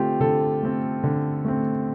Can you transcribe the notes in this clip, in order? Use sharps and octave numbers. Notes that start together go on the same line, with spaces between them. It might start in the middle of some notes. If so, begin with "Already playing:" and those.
Already playing: D3 A3 C4 F4 G4
D3 A4
A3 C4
D3
A3 C4